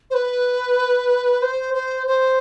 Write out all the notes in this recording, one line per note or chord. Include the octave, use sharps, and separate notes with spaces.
C5
B4
C5
C5
C5